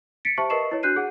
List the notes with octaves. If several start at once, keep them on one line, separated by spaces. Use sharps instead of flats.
A6 B6 C#7 D7
G4 C5 E5 A5 C#6
A#4 B4 D#5 C#6 C7 E7
E4 C#5
D4 F#4 F#6 G6 C7 D#7
G#4 F#5